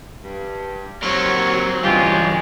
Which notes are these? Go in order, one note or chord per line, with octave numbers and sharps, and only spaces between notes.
G2
D#2 F#3 C4 A#4 C#5
C#2 G2 E3 G#3 F4 G4 G#4